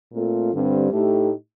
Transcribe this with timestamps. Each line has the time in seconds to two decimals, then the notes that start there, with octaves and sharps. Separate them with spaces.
0.13 A#2 A3 C4 F4 A4
0.52 G2 D3 G3 C4
0.92 A2 A3 D#4 G4